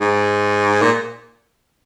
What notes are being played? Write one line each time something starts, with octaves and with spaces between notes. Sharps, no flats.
G#2
A#2